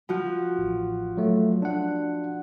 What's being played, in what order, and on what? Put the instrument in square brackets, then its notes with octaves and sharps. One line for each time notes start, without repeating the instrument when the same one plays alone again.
[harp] F3 F#4
[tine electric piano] A1
F#3 A3
D4 F#5